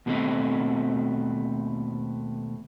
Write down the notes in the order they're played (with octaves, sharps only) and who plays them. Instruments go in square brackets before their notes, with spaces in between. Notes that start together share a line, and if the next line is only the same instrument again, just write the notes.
[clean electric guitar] D#2 B2 G#3 A3 C4 D#5